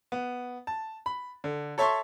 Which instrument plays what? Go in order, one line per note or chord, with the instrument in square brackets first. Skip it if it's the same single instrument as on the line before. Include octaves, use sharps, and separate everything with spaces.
[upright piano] B3
A5
B5
D3
A4 C#5 E5 A5 C6 C#6